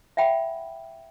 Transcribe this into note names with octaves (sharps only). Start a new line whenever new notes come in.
E5 F#5 G5 B5